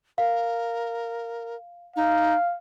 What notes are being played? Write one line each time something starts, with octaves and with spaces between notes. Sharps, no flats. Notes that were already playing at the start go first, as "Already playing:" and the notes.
A#4 F5
D#4 F5